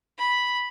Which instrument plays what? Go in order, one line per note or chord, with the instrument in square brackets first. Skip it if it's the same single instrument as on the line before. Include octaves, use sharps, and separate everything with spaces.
[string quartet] B5